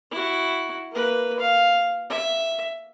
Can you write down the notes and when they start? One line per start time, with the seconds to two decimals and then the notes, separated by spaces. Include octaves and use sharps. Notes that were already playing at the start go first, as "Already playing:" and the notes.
0.11 E4 F#4
0.92 A#3 B4
1.40 F5
2.10 E5